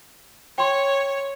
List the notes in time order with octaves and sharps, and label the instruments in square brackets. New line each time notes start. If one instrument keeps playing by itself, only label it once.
[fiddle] C#5 [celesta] G5 C6